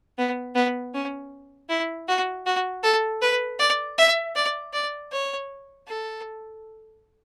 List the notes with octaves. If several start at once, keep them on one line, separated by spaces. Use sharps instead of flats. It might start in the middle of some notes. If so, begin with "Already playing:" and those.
B3
B3
C#4
E4
F#4
F#4
A4
B4
D5
E5
D5
D5
C#5
A4